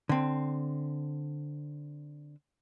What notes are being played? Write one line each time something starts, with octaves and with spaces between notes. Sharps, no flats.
D3 C4